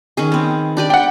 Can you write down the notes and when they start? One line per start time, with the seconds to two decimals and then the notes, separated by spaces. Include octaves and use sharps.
0.17 D#3 C#4 G#4
0.32 B3 C4
0.77 D4 G4 D5
0.90 D4 F#5 G5